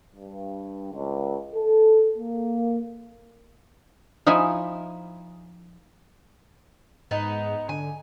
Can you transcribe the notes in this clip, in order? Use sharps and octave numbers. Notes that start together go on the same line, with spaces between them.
G2
C#2
A4
A#3
F3 D#4 E4 E5 G#5
G#2 B3 D#4
D3 G#5